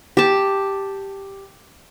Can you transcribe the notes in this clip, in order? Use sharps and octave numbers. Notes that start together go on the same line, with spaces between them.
G4 A5